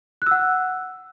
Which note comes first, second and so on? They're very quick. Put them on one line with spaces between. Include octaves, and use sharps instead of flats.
F#6 E6 F#5